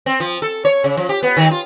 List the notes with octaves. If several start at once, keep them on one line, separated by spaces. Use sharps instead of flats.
C4
F3
A4
C#5
C#3
F3
G4
B3
D#3
F4